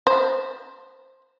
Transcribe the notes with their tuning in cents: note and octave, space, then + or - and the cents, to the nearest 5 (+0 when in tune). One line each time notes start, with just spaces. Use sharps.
C5 +5